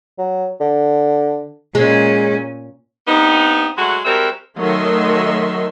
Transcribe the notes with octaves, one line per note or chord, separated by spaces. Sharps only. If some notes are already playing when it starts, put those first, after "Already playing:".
F#3
D3
A#2 G#3 C#4
G2 B3 C4 D#4
F#3 G#3 A3 F#4
G3 G#3 C4 F#4 A#4 E5
D#3 F#3 A3 D#5 E5 C6